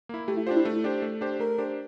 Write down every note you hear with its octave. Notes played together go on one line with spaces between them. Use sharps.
A#3 E4
A3 G4
E4
D4 F4 G4 C5
E4
A3
D4 G4 C5
A3
D4 G4 C5
A3 A#4
D4 G4 C5